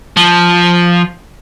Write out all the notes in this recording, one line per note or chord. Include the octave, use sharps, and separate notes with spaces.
F3